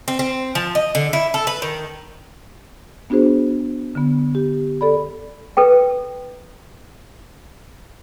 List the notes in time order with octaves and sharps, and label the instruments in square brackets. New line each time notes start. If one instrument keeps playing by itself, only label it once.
[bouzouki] C4
C4
F3
D#5
D3
E4
A4
B4
D#3
[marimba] B3 D4 F#4 G#4 C5
D3 B3
G4
A4 D5 B5
[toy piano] A4 B4 G5